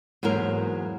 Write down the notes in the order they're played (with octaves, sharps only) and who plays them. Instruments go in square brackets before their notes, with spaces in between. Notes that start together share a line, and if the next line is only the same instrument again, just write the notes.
[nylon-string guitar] E2 G#2 F#3 A#3 A#4